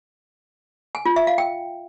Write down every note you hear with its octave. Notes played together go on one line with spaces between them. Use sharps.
G#5
F4
E5
F5
G5